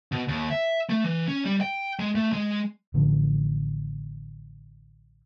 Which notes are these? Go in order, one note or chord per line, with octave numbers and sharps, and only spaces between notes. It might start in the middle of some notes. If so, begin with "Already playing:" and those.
B2
D#2
E5
A3
E3
C#4
G3
G5
G#3
A3
G#3
A1 D3 F3